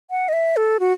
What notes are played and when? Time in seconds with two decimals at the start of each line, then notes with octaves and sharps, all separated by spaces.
0.10 F#5
0.29 D#5
0.33 E5
0.57 A4
0.80 F#4